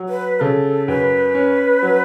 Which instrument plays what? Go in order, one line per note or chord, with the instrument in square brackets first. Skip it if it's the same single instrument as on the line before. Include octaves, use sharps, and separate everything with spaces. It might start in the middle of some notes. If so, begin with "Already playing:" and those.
Already playing: [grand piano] F#3
[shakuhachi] B4
[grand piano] C#3 [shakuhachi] A4
[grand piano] F#2 [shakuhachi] B4
[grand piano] C#4
F#3